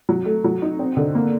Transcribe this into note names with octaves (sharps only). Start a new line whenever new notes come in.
F#3
A3
F#3
D#4
C4
D3
A#3